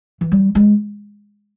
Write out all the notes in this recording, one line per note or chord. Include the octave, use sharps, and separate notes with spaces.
E3
G3
G#3